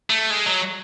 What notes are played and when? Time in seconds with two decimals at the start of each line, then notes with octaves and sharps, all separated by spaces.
0.10 A3
0.30 G#3
0.46 F#3